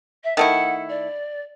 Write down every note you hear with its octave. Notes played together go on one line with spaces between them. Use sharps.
E5
D#3 A3 E4 F#5
D5